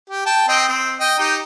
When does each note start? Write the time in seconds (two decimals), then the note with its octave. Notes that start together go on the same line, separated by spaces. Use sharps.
0.10 G4
0.26 G5 A5
0.49 C4 D#5 G5
0.68 C4
1.00 D#5 G5
1.19 D#4 G4